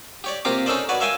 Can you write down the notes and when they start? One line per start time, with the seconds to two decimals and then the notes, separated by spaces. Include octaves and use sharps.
0.24 G4 C#5 D5
0.45 C3 A#3 F4 G4 A#5 D6
0.66 C#4 D#4 A4 A#4 C5 D5
0.89 F#4 B4 C#5 D5
1.00 A#4 C#5 E5 F5 G5 G#5